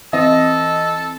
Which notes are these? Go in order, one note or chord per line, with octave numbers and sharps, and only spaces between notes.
E3 C4 A4 D#5